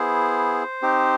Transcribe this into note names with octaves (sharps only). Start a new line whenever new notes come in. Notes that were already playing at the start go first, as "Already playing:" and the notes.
Already playing: B3 E4 G#4 C5
C4 D#4 G4